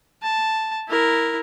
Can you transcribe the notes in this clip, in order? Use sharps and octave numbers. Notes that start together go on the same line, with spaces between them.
A5
E4 A#4